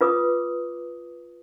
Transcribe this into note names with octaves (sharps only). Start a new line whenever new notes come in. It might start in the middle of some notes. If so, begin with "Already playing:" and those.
F4 B4 D6 D#6